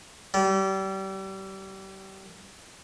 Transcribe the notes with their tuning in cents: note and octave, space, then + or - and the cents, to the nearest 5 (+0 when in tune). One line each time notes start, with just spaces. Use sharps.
G3 -30